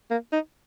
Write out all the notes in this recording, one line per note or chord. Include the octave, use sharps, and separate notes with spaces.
A#3
D#4